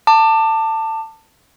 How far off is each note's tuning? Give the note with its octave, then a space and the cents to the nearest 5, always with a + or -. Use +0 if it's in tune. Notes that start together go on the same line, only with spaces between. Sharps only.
A5 +20 D6 +25